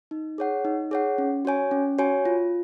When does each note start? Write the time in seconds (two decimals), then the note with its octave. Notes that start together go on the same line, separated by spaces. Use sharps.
0.11 D#4
0.38 G#4 C#5 F#5
0.65 D#4
0.91 G#4 C#5 F#5
1.18 C#4
1.45 F#4 C#5 G#5
1.71 C#4
1.98 F#4 C#5 G#5
2.25 F4